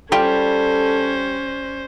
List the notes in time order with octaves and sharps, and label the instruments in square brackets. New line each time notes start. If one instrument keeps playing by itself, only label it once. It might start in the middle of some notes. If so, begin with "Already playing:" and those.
[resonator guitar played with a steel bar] G3 [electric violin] C#4 C5 [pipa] F4 G4 [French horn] A4